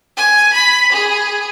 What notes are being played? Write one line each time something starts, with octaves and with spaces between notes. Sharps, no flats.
G#5
B5
G#4